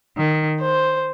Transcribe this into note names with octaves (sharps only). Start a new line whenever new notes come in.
D#3
C5